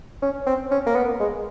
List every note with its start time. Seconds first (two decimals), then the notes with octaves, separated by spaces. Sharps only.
0.22 C#4
0.47 C4
0.71 C#4
0.86 A#3
0.95 B3
1.20 G#3